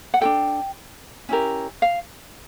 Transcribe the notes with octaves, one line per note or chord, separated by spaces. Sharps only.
F#5
D4 F#4 A4 G5
C#4 E4 G4 A#4
F5